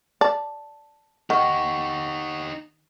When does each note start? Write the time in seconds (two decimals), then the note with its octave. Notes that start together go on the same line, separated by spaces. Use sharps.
0.21 D5 A5
1.30 D#3 D#4 G4 F#5 C#6